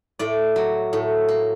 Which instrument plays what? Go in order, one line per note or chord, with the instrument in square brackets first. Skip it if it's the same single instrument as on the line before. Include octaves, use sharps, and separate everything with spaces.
[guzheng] A2 D5
F#3
A2
A#3